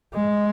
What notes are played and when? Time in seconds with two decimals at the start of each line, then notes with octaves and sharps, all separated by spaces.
0.15 G#3